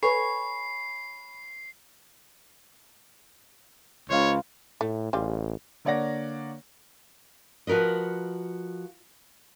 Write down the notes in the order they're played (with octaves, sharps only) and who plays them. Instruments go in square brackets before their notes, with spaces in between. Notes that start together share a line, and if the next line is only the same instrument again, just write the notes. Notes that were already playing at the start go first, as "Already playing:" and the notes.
[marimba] A4 B4 [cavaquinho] C#5 G#5 C#6 [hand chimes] B5 [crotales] C7
[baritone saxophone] C#2 [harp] C5 D#5 F5 [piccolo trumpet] C#5
[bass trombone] A2 [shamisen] A3
[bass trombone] A1 [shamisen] G3 G#3 F4
[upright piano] D3 A#3 C#5 D5 F#5 A#6
[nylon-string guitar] F3 F#4 A#4 B4 D#5